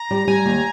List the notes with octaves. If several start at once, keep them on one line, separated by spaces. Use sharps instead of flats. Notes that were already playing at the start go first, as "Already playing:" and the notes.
Already playing: A#5
G3
G3 G#5
D#2